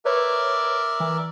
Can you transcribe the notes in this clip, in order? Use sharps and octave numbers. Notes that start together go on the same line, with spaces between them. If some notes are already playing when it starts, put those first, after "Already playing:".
A#4 B4 C#5 D5 E5
E3